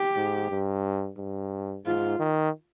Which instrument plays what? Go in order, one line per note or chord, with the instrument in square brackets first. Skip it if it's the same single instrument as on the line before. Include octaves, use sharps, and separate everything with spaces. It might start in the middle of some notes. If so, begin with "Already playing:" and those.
Already playing: [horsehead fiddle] G4
[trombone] G#2
G2
G2
[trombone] G#2 [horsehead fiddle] F4
[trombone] D#3